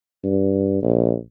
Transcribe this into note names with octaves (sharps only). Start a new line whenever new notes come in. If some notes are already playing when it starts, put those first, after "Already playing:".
G2
A#1